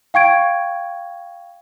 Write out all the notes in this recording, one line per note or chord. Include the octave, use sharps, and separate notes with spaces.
F5 G5 C#6 G#6 D7